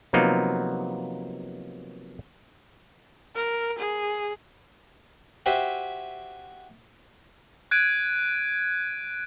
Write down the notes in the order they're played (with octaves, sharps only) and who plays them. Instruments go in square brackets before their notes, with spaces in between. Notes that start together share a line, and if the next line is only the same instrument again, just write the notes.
[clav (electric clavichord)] C3 F3 F#3 A#3 B3 D#4
[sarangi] A#4
G#4
[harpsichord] F#4 G4 C5 E5 G#5
[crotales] F#6 G#6 D7 D#7